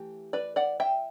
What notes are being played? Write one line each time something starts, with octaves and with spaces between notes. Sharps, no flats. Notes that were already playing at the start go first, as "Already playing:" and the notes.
Already playing: E3 A3 G4
B4 D5
D5 F#5
E5 G5